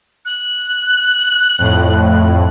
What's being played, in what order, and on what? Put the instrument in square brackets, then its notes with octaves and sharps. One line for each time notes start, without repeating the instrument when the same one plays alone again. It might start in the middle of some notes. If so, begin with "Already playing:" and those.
[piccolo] F#6
[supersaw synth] F2 A2